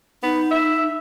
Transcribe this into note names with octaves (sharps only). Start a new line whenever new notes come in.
B3 D#4
E5